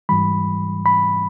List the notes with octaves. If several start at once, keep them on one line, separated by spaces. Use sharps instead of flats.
G#2 E3 G3 B5
B5